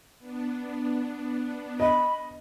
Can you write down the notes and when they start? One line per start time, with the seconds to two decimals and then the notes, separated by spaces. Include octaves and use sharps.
0.19 B3 D4
1.80 D#5 B5